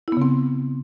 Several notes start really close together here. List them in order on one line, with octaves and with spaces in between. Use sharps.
E4 B3 C#3 C4